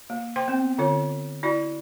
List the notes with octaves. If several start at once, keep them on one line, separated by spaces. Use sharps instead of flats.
A#3
C5 G5 C6
B3 C4
D3 F4 C#5
E4 F#4 D5